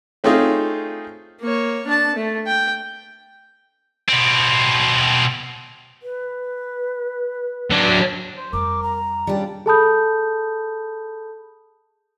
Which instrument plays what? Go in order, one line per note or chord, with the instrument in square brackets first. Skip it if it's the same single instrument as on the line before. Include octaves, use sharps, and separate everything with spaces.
[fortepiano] A3 C4 C#4 D#4 F4 G#4
[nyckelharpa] A#3 C#5
D4 A5
A3
G5
[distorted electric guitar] B2 C4
[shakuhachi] B4
[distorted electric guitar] F#3 D4
[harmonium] C5
[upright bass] F2 G3 [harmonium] A#4 [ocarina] D6
[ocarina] A#5
[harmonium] C#3 D4 [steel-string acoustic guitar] G3 G4
[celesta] G#4 A4 A5 B5 D#6 G6